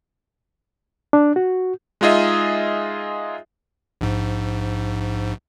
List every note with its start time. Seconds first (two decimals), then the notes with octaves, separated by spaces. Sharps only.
1.13 D4
1.36 F#4
2.01 G#3 D#4 F4 G#4 D#5 E5
4.01 A#1 G#2